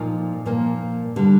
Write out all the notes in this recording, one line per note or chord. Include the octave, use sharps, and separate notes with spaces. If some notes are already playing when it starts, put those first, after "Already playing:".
Already playing: A#2 F3 A#3 D#4 A4
A#2 F3 A#3
D3 G3